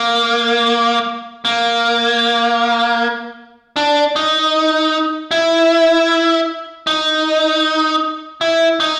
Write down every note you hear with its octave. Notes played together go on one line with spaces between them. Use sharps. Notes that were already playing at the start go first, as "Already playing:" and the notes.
Already playing: A#3
A#3
D4
D#4
E4
D#4
E4
D#4